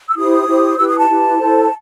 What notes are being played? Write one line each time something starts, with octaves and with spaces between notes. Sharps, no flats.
E6
E4 G4 C5 D#6
E4 G4 C5
E4 G4 B4 E6
D#6
A5
E4 G4 B4
E4 A4 C5